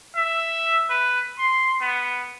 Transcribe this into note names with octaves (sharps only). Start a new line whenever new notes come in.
E5
B4
C6
B3